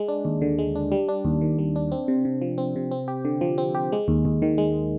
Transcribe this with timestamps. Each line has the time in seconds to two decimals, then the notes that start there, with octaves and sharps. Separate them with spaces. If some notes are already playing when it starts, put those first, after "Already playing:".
Already playing: G#3
0.08 D4
0.25 D#2
0.42 D3
0.58 G#3
0.75 D4
0.92 G3
1.09 D4
1.25 D#2
1.41 D#3
1.59 G3
1.76 D4
1.92 C4
2.08 C3
2.25 C3
2.42 F3
2.58 C4
2.76 C3
2.91 C4
3.08 G4
3.25 D3
3.41 F3
3.58 C4
3.75 G4
3.92 G#3
4.08 D#2
4.25 D#2
4.42 D#3
4.58 G#3